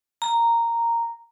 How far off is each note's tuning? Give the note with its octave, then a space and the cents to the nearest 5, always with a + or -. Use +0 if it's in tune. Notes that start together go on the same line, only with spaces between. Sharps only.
A#5 -5